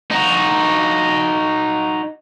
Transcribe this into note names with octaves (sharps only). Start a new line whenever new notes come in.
D#4 F#4